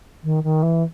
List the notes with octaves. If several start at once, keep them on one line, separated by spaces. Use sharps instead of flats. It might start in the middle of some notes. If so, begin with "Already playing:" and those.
D#3
D#3
E3